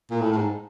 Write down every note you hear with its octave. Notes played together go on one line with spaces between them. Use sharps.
A#2
A2
A2
G#2